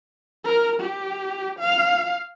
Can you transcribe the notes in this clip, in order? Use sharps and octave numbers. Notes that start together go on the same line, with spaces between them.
A#4
G4
F5